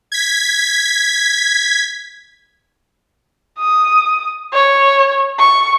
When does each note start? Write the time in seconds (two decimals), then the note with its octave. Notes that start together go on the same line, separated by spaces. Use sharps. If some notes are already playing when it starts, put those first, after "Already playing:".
0.12 G#6 B6
3.59 D#6
4.54 C#5
5.39 C#6